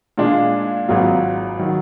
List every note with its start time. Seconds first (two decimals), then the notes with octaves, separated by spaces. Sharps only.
0.18 A#2 G#3 D4 F4
0.88 G#1 G#2 F#3 A#3 F4
1.59 D#3 F#3